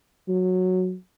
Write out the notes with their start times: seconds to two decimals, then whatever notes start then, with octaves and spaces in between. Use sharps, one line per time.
0.28 F#3